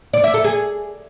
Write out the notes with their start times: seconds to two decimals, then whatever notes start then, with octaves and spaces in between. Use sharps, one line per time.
0.13 D5
0.24 E5
0.34 A4
0.44 G#4